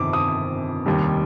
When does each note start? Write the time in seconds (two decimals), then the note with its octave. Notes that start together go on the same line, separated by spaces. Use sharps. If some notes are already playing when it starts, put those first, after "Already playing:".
Already playing: G1 F2 C3 D#3 D6
0.13 D#6
0.86 F1 D#2 D#3 G3